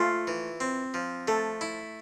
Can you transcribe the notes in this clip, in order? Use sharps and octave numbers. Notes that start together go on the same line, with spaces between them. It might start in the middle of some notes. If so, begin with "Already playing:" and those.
Already playing: A3 F4
E3
C4
F3
A3 A4
E4